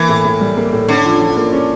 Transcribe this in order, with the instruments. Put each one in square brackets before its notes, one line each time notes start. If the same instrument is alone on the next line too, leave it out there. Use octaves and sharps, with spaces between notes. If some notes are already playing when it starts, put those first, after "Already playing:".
Already playing: [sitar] E3 [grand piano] A#3
[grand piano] A2
A2
G3
A#3
A2
[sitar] D3 [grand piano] C#4
[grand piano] F3
F3
A#3
C#4